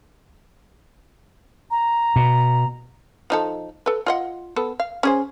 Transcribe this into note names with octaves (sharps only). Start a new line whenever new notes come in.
A#5
B2
F3 D#4 A4
A4 B4
F4 D#5 F#5
B3 A4
F5
C#4 G#4 C5